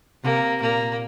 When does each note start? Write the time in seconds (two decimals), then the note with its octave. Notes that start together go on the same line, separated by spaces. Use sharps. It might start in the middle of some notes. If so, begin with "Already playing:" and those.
0.24 C3 A#3
0.60 A#2 A#3